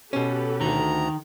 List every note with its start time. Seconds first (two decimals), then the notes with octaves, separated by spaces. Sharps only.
0.13 B2 C#4 G4 A4 B4
0.61 D2 D#3 A#5